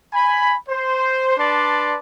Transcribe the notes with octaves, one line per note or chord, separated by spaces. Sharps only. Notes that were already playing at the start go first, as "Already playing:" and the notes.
G#5 B5
C5
D4 B4 D5 A5 C6